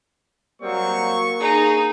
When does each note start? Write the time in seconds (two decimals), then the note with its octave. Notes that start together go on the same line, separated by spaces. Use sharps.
0.62 F#3 G3 A#3 C4 C#6
1.40 D#4 G#4